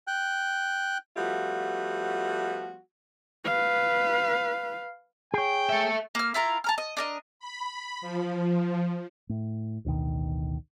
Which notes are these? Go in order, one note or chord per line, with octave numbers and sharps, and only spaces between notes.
G5 F#6
F3 G3 A3 B3 F4 F#4
B4 F5
G#4 C#5 G5
A4 E5
A#3 F6
E4 F4 A#4 A#5
A5 A#5 F6
D#5
D4 A#4 D#5
B5
F3
A2
A1 D2 B2 D#3